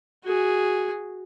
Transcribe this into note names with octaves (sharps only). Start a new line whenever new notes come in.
F#4 G#4